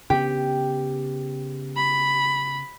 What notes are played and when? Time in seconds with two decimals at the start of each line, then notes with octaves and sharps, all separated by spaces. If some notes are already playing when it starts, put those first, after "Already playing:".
0.10 C#3 B3 G4
1.77 B5